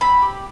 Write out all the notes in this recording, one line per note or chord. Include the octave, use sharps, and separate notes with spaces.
C4 B5
G4